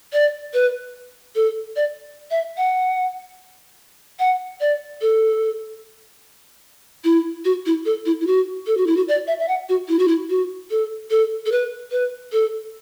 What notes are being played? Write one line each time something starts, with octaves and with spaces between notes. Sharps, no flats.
D5
B4
A4
D5
E5
F#5
F#5
D5
A4
E4
F#4
E4
A4
E4
E4
F#4
A4
F#4
E4
F#4
D5
E5
E5
F#5
F#4
E4
F#4
E4
F#4
A4
A4
A4
B4
B4
A4